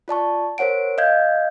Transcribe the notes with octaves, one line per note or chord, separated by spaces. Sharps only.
F4 D5 A5 C#6
A#4 C5 C#5 F#5 D7
D#5 F5 G6 G#6